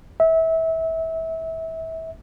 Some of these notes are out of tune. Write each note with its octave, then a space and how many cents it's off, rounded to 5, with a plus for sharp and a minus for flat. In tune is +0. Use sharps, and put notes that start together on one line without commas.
E5 -25